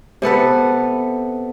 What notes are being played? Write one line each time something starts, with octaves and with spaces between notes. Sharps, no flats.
C3 B3 A4 B4